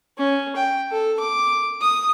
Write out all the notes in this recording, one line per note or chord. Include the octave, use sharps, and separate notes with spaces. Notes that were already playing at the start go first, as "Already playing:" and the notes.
C#4
G5
A4
D6
D#6